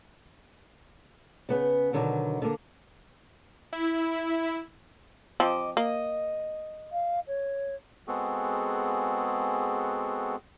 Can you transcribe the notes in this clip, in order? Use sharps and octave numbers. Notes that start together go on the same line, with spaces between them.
C#3 B3
B2 D3 D#3 F#3
D3 A#3
E4
F3 C4 D#5 C#6 D6
A#3 D#5
F5
C#5
G#3 B3 C4 F#4 G#4 A4